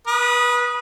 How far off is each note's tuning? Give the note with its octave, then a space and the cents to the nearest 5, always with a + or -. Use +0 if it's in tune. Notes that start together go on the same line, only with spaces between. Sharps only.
B4 -25 D#6 +0